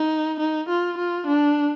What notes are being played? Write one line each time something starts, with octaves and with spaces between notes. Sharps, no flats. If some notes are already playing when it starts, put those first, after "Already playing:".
Already playing: D#4
D#4
F4
F4
D4